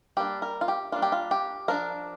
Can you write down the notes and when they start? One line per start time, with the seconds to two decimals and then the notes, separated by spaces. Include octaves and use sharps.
0.17 G3 A#3 D4 G4
0.42 A#4
0.61 F4
0.68 G4
0.92 G3 A#3 D4 F4
1.02 G4
1.12 F4
1.31 G4
1.68 F3 D4 A#4